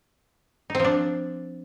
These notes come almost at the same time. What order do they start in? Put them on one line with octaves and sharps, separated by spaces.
D#4 C4 F3 D4